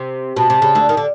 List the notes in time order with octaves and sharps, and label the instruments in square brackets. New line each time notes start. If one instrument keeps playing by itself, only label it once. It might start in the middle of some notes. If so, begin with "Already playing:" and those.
Already playing: [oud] C3
[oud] B2 [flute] A5
[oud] C3
C#3
D2 D3
D#3
D3